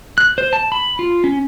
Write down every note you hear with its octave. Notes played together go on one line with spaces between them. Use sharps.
F#6
C5
A5
B5
F4
C#4